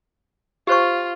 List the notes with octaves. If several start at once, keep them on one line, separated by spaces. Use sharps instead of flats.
F4 G4 C5 C#6